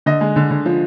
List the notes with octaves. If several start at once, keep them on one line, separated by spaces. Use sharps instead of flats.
D3 D#5
G#3
D3
D3
F3